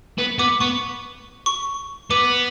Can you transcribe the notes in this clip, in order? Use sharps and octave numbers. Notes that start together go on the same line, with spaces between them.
B3
B3 D6
B3 C#6
C#6
B3 D6